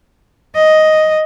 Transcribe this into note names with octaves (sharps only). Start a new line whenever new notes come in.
D#5